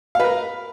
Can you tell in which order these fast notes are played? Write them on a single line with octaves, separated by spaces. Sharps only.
F5 B4 A#4